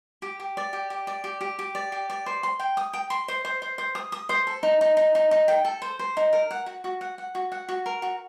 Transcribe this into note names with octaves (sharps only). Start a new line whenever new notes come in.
G4
G4
D5
G4
G4
D5
G4
G4
G4
D5
G4
D5
C5
C6
G5
D#6
G5
C6
C5
C5
C5
C5
D#6
D#6
C5
A4
D#4
D#4
D#4
D#4
D#4
G5
A4
C5
C5
D#4
A#4
F#5
F#4
F#4
F#5
F#5
F#4
F#5
F#4
A#4
F#4